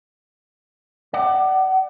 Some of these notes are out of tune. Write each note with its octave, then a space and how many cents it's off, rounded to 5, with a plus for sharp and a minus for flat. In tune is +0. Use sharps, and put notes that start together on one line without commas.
D5 +25 F#5 +35